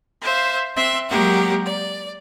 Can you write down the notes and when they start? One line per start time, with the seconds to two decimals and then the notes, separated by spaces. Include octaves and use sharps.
0.22 C5 E5 F5
0.76 C4 E5 C6 F#6
1.08 F#3 G#3 A#3 G4 A#4 F#5
1.66 D5